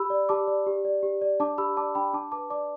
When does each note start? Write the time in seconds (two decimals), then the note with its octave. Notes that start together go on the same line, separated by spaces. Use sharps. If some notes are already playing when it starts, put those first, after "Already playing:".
Already playing: G4 B5 E6
0.10 D5
0.29 G4 A5 D6
0.48 D5
0.67 G4
0.85 D5
1.03 G4
1.22 D5
1.40 D4 A5 D6
1.58 G4 B5 E6
1.77 D5 A5 D6
1.95 D4 G5 B5
2.13 D4 A5 D6
2.32 B4 A5 D6
2.50 D5 A5 D6